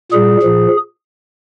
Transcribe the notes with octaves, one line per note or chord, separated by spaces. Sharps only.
A#2 G3 G#4
A#2 F3